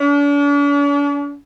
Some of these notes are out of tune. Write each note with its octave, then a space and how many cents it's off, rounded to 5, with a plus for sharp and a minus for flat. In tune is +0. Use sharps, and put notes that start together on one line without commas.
D4 -45